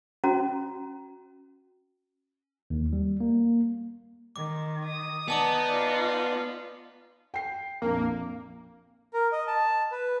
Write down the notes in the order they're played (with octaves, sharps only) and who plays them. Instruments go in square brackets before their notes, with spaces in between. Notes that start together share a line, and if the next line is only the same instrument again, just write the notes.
[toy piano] C#4 F#4 A#5
[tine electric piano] D#2
G3
A#3
[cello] D#3 [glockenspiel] D6
[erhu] D#6
[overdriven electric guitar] B3 [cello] D#4 D5 [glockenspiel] G#5 A5 D6
[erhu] F4
[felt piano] G5 C7
[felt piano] A#1 F2 [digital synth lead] A#3
[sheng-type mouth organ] A#4
D#5
A5
B4